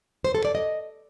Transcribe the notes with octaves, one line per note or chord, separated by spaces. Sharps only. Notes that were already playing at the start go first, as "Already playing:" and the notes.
C5
A4
D5
D#5